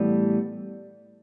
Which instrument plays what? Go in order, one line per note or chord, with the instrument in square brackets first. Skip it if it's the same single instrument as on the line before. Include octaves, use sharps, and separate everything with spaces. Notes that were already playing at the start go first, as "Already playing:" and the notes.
Already playing: [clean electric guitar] A2 E3 G3 B3